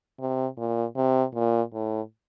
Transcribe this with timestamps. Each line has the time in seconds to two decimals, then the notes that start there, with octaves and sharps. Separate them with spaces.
0.19 C3
0.58 A#2
0.96 C3
1.35 A#2
1.74 A2